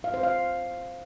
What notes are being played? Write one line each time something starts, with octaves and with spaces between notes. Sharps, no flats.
F5
C5
F5